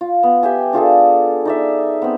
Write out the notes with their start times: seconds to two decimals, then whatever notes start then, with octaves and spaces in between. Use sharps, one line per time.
0.01 F4
0.23 B3
0.43 G4 E5 G5 G#5
0.73 D4 F4 G#4 A4
1.45 D#4 D5 E5
2.02 B3 C4